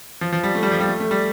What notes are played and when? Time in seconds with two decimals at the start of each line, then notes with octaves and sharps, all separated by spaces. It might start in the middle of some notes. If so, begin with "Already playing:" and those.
0.21 F3
0.33 F3
0.43 G3
0.55 A3
0.63 G3
0.72 F3
0.80 G3
0.88 A3
1.00 A3
1.11 G3